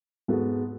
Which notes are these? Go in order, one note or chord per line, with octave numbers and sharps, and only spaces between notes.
G#2 G#3 B3 F#4 A4